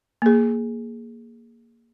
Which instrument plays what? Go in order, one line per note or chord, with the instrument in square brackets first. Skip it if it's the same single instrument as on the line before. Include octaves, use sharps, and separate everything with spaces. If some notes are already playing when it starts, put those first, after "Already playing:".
[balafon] A#3 G#4